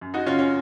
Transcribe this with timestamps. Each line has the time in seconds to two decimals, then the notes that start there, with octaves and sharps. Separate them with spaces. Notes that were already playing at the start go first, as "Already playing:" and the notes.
0.01 F#2
0.14 D#4 F#4
0.26 C#3 C#4 F4
0.39 C#4